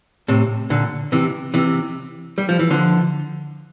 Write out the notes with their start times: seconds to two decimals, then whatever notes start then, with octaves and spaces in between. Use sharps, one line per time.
0.28 A2 C3
0.70 A#2 D3
1.12 C3 E3
1.54 C3 E3
2.38 G3
2.49 F3
2.59 E3
2.70 D3 F3